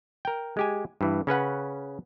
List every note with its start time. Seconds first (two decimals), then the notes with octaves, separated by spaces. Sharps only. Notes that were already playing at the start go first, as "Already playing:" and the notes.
0.25 A#4 G5
0.57 G#3 G4 G#5
1.01 G2 E3
1.27 C#3 C#4 B4 F#5